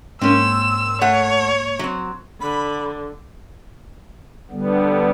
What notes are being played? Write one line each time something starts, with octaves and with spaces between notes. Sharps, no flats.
G#2 A#3 C4 C#4 E6
A3 C#5 F#5
F#3 C4
D3 B5
D3 G3 B3